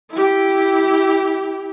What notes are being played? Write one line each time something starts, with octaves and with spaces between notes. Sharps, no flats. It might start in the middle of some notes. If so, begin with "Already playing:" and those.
E4 G4